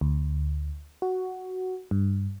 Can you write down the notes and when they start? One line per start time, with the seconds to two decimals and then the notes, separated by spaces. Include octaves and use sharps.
0.01 D2
1.02 F#4
1.91 G2